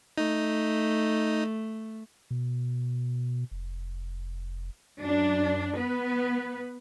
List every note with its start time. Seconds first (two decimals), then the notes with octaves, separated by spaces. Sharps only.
0.18 A3 D#4
2.31 B2
3.51 F1
5.00 F#2 D4
5.75 B3 B4